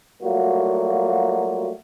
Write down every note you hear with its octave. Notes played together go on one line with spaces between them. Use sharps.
F#3 G3 A3 A#3 F4 F#4